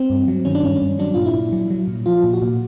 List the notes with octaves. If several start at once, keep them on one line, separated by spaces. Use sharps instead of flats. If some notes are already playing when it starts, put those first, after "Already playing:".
Already playing: C4
G2
F#3
D#3 C#4
D4
G2 C#4
G2
F#3 D4
A#2 F4
E4
A#2
F#3
F#3
A#2
F3 F4
A#2
F#4
A#2